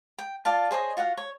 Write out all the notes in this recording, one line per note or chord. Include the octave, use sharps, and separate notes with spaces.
G5
F4 D5 F5 A5
G#4 C5 C#5 D#5
F4 F#4 F5 F#5
C#5